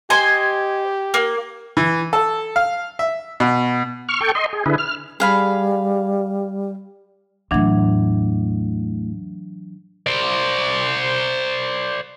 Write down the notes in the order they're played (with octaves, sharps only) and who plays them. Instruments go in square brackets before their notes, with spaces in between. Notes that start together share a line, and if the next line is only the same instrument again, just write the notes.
[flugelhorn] G4 [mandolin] C5 D#5 G#5
[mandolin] A#3
[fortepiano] E3
A4
F5
E5
B2
[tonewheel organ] C#6 F6
A4 G5 C#6
D#5 C6
G#4
D3 E4 G#4 B4
F6
[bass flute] G3 [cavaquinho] G#4 F5 B5
[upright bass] E2 A2 [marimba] E3 F#3 D4
[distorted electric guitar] C5 D5